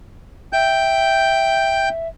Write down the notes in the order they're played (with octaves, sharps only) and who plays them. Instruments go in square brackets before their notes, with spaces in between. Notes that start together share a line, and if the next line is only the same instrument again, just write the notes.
[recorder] E5 [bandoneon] G5 G6